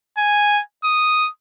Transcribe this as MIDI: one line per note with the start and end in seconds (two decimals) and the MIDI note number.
0.18 0.61 80
0.84 1.30 87